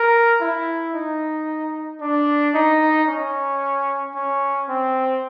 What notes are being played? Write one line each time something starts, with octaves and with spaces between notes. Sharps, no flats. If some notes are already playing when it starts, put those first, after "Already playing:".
Already playing: A#4
E4
D#4
D4
D#4
C#4
C#4
C4